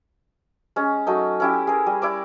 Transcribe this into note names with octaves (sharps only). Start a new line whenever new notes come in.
G#3 C#4
F#3 A3 D#4
C#4 E4 G4
G#4 A#4
G3
E4 D5 D6